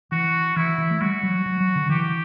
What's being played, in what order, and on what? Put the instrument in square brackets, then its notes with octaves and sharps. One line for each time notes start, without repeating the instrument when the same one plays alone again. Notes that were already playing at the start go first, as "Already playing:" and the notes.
[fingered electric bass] E3 [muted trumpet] F#4
[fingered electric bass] E3 [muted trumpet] E4
[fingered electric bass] E3
A3
[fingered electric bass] G3 [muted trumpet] F#4
[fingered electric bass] F#3
F#3
F#3
D3
[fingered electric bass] E3 [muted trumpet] G4